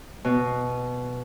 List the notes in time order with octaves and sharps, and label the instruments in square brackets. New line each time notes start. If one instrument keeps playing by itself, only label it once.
[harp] B2